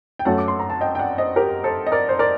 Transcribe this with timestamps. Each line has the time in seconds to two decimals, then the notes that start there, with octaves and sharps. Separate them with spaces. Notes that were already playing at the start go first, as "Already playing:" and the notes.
0.19 G5
0.25 F#2 F#3 A3 F#5 A5
0.38 D6
0.48 C6
0.59 A#5
0.70 A5
0.81 D#5 G5
0.95 G5
0.99 D5 F#5
1.18 C5 D#5
1.36 G4 A#4
1.64 A4 C5
1.87 D#5
1.92 A#4 D5
2.09 C5
2.19 A#4 D5